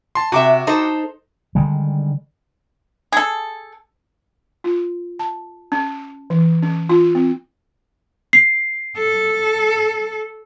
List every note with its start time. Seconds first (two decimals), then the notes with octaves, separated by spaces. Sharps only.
0.15 A5 C6
0.32 C3 F#4 E5 D6
0.67 D#4 A4 C5
1.55 D3 D#3 G3 G#3
3.12 G#4 A4
4.64 F4
5.19 A5
5.72 C#4
6.30 E3
6.62 C#4
6.89 F4
7.15 C4
8.33 C7
8.97 A4